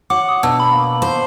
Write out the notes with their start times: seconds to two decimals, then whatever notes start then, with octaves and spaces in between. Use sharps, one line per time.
0.10 F#4 C#5 F#5 D6
0.29 D#6
0.43 B2 D4 E6
0.60 D4 A#5 B5
0.73 A#3
1.02 C5